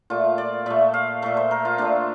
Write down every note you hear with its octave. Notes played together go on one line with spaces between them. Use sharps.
A#2 A3 F4
D5
A#2 A3 E5
F5
A#2 A3 E5
C5
A#4
F4
A#2 A3 D4